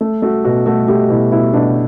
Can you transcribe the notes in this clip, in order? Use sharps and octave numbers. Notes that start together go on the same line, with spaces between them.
A3
A3 F#4
B2 F#4
A3 F#4
A3 G4
B2 E4
B2 E4
B2 D4